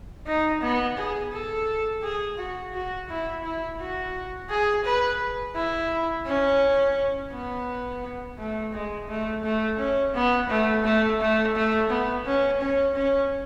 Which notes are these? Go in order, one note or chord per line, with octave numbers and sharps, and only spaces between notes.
D#4
B3
G#4
A4
G#4
F#4
F#4
E4
E4
F#4
G#4
B4
E4
C#4
B3
A3
G#3
A3
A3
C#4
B3
A3
A3
A3
A3
B3
C#4
C#4
C#4